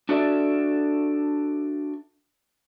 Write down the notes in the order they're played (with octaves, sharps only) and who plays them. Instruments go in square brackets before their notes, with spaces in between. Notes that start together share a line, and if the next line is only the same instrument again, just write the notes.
[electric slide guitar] D4 F#4 A4 D5 E5